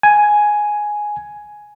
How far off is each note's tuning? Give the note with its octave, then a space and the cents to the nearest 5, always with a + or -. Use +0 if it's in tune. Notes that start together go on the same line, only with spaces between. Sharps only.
G#5 +5